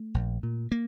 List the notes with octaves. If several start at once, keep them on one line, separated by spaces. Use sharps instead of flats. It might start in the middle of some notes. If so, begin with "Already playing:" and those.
Already playing: A3
A#1
A#2
A#3